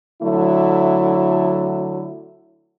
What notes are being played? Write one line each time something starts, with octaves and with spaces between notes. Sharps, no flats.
D3 F#3 A3 E4